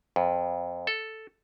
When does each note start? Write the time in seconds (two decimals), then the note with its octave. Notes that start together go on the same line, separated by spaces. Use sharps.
0.16 F2
0.87 A4